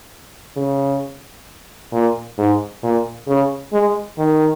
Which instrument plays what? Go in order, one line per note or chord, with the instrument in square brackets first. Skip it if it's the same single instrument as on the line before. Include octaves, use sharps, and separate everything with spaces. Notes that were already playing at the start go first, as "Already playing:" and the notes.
[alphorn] C#3
A#2
G#2
A#2
C#3
G#3
D#3